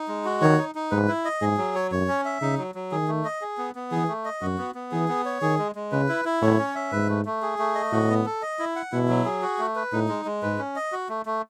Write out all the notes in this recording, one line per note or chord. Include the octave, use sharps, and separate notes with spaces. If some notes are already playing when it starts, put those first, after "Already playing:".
Already playing: D#4
G#3
F#4
D#3 C#5
D#4
D#4
G#2 B4
E4
D#5
G#2 G#4
F#3
C#5
F#2 C#5
C#4
E5
C#3 D#4
F#3
F#3
D#3 G#4
A3
D#5
G#4
B3
B3
E3 G#4
A3
D#5
F#2 F#4
B3
B3
E3 G#4
B3
C#5
D#3 G#4
G#3
G#3
C#3 B4
E4
E4
A2 C#5
C#4
E5
G#2 B4
A3
A3
G#4
A3
D#5
A2 F#4
B3
A4
D#5
E4
F#5
B2 E4
F#3
G#4
F#4
A3
B4
A2 D#4
G#3
G#3
G#2 B4
C#4
D#5
F#4
A3
A3